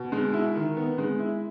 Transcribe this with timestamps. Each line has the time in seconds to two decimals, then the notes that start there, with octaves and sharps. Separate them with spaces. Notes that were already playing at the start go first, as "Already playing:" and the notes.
Already playing: B2
0.12 G#3
0.33 E4
0.55 D#3
0.77 B3
0.98 G#3
1.19 E4